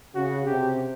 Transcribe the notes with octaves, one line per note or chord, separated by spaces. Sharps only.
C#3 F#4
C3 G4